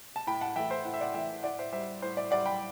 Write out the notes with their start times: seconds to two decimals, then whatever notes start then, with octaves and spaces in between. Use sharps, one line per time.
0.16 A5
0.27 A2 G5 B5
0.41 F#5 A5
0.56 E3 A3 E5 G5
0.70 C5 E5
0.85 A2 F#5
0.94 E5
1.01 D5 F#5
1.14 E3 A3 E5 G5
1.43 A2 D5 F#5
1.58 C5 E5
1.72 G3 C5 E5
2.02 A2 C5
2.17 D5
2.31 G3 D5 F#5
2.46 G5 B5